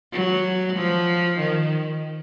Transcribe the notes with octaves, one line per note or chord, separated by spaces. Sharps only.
F#3
F3
D#3